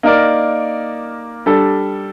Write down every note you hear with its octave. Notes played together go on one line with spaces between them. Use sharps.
A#3 D#4 A#4 D5
G3 D4 A4